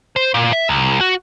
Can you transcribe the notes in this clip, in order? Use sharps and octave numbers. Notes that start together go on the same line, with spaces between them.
C5
A#2
E5
C2
F#4